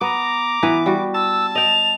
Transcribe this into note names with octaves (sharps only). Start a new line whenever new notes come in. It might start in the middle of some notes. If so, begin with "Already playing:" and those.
B3 A#5 D6
E3 B3 B4
G3 F#4
A5 E6
D#5 G5 F7